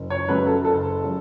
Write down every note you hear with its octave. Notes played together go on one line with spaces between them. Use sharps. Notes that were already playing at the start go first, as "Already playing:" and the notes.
Already playing: F#1
C#5
F#2 C#3 F#3 B4
A4
F#1 A4
C#3 F#3